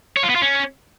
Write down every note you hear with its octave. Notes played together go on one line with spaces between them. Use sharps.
C#5
F4
B3
F4
C#4